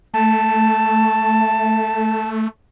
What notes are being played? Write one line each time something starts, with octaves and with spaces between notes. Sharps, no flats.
A3 A5